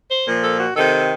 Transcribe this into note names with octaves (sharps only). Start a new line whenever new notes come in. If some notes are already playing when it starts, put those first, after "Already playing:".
C5
A#2 F3
A4
F#4
C3 D#3 A4